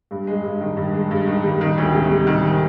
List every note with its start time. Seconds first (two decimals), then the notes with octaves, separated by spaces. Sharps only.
0.11 G2
0.27 G#3
0.43 G2
0.61 D#3
0.77 G2
0.94 G#3
1.11 G2
1.27 D#3
1.44 G3
1.61 D#3
1.78 D2
1.94 C3
2.11 G3
2.27 D#3